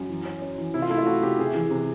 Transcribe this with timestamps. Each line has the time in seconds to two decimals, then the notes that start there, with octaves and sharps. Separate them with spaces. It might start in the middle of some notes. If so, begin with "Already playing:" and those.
Already playing: F#2
0.09 E3
0.25 C#4
0.42 C#4
0.58 E3
0.74 C3 E4
0.82 F4
0.90 A3 E4
0.98 F4
1.06 A3 F#4
1.22 C3 G4
1.39 C3 G#4
1.55 E3
1.71 C3